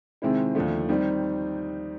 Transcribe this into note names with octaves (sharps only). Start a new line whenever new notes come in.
C3 D#3 G#3 C4 E4
D#2 D3 F3 A3
D#3 G3 C4 D#4